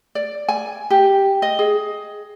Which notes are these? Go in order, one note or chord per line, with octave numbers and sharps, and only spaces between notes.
D5
G#5
G4
D#5
G#4